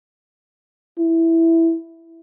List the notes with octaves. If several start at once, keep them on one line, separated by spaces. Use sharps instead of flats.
E4